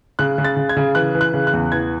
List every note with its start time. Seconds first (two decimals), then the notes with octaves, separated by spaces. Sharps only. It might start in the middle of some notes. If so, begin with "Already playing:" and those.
0.19 C#3 F#6
0.38 C#3
0.44 A6
0.57 C#3
0.69 G#6
0.77 C#3
0.95 E3 F#6
1.15 E3
1.21 F#6
1.34 C#3
1.47 F#6
1.53 E2
1.72 E3 G#6